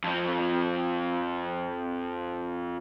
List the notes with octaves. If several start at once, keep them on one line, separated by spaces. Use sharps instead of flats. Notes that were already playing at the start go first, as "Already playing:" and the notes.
F2 F3